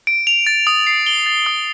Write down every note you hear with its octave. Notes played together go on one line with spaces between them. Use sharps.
D7
F7
A6
D#6
C7
G7
A6
D#6